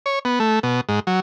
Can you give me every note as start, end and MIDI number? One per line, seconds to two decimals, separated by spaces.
0.06 0.19 73
0.25 0.39 59
0.40 0.59 57
0.63 0.81 47
0.89 1.00 44
1.07 1.20 54